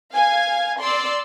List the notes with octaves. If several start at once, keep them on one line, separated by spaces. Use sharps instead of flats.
F5 G#5
D5 C6 E6